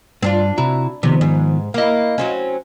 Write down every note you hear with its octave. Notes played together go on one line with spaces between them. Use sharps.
G2 C4 D4 F4
C3 E4 F#4 A#5
C3 D#3 F3 B3
G#2
A#3 E4 D#5 F5
F#3 C4 C#4